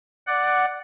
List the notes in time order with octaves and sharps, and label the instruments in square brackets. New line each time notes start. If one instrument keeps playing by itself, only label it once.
[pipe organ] D5 F#5